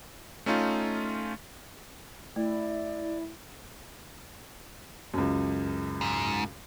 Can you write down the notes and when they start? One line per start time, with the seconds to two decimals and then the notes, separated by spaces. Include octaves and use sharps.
0.46 A3 C#4 D#4 F4
2.36 A3 E4 D5
5.14 C#2 F#2
6.01 G#2